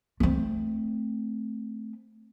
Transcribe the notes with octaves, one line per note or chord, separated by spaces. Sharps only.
A3 C4